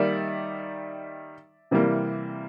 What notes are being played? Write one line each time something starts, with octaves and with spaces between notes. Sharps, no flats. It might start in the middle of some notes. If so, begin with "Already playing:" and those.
Already playing: D#3 G3 A#3 D5 E5
C3 E3 G3 A#3